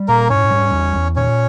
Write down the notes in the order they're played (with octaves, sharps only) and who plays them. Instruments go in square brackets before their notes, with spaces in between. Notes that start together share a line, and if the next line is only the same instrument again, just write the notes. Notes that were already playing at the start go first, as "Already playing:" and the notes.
Already playing: [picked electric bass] G3
[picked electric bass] A#2 [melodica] A#3 A#4
[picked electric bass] G#2 [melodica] C#4 C#5
[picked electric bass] G3
E2
E2
[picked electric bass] A#2 [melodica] C#4 C#5